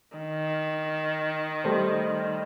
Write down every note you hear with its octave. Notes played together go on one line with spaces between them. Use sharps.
D#3
G3 A3 C5